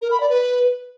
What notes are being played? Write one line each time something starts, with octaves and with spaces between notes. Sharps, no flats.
A#4
B5
D5
B4